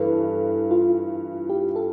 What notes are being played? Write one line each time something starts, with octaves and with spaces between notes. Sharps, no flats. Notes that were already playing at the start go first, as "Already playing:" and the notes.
Already playing: G2 E3 A4 B4
F4
G4
A4